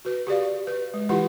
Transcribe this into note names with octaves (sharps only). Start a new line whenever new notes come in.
F#4 B4
G4 G#4 D5 F5
B4
G#3
E3 E4 F4 G4 B4 F#5